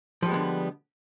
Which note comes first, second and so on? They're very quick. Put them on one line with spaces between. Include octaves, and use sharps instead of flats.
F3 G3 G#3 B3 D3